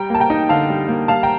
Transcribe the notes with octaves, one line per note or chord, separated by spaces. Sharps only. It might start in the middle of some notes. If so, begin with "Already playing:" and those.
Already playing: G3 G5 A#5
A#3 A5
G5 A#5
D#4
D3 F5 A5
G3
A#3
G3 F5 A5
G5 A#5